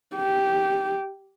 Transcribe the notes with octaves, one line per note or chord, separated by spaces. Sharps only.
G4